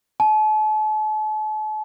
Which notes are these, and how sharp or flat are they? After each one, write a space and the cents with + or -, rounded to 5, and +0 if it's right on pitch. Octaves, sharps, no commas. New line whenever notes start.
A5 -40